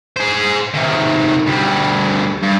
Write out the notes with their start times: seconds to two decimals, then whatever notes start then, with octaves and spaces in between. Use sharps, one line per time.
0.17 G#4 C5
0.74 C3 D#3
1.46 D2 G3
2.43 G2